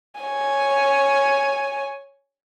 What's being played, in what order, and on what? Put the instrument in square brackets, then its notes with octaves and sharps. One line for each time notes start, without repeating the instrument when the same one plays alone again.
[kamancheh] C#5 G#5